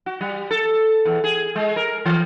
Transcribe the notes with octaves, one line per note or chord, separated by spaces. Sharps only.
F#4
G3
A4
E2
G#4
G#3
A#4
E3